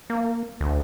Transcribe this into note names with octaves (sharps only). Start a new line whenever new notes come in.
A#3
D2